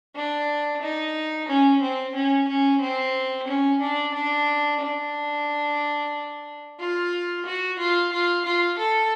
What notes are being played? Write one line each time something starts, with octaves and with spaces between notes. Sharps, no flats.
D4
D#4
C#4
C4
C#4
C#4
C4
C#4
D4
D4
D4
F4
F#4
F4
F4
F4
A4